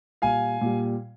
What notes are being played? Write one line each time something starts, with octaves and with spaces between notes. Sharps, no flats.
A#2 G3 F5 G#5
A#2 G3